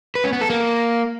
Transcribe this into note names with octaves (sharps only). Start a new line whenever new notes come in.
B4
C#4
B3
A4
A#3